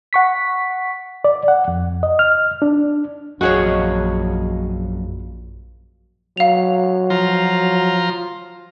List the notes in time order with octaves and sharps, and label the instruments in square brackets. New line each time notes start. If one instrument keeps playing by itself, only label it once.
[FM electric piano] F#5 C#6 B6
[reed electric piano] D5
F#5
F2
D#5
F6
D4
[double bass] A#1 [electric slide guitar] F#2 D#5 F5 [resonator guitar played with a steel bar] F#4 G#4 C#5
[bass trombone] F#3 [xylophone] F5 F7
[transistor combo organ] F3 A#5 C6